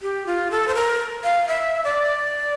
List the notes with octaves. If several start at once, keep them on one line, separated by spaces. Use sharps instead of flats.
G4
F4
A4
C5
A#4
F5
E5
D5